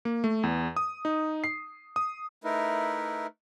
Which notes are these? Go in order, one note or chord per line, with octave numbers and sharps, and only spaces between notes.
A#3
A3
E2
D#6
D#4
C7
D#6
A3 D#4 E4 A#4 B4